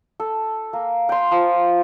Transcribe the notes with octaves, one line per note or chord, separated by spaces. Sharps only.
A4
A#3
G5 C6
F3